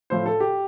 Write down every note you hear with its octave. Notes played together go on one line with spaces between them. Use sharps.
A2 F3 A3 C5
A4
G4